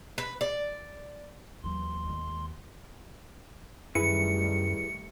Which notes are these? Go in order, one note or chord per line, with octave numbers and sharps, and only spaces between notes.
B4
D5
D#2 E3 F#3 C6
D#3 G#3
F#2 D#3 G3 A3 E4 G#4 B4 C#7